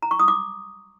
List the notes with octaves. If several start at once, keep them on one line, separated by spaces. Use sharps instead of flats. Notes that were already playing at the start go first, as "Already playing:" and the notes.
A#5
C#6
D#6
D6